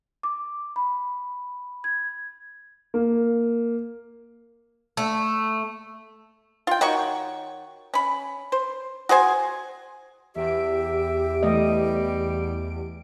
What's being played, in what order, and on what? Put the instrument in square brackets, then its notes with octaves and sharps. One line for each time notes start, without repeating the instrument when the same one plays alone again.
[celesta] D6
B5
G#6
[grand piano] A#3
[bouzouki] A3
[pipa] F4 G5
D#3 F#4 C#5 C#6
C#4 B5
C5
F#4 G#4 C5 G#5
[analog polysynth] E2 D7 [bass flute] G4 [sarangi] E5
[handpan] E3 A3 D#5 [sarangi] G3